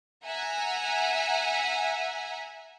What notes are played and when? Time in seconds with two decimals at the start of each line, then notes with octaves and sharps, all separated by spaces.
0.25 E5 F#5 G#5 A#5